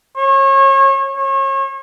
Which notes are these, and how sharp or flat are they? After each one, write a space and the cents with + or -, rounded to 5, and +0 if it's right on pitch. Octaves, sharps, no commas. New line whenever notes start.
C#5 -35
C#5 -35